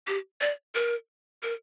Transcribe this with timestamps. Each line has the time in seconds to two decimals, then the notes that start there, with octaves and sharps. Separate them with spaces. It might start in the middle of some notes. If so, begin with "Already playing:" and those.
0.07 G4
0.41 D5
0.75 A#4
1.43 A#4